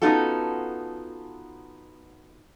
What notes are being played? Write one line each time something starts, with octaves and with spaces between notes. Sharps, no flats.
B3 C#4 D#4 F4 F#4 A4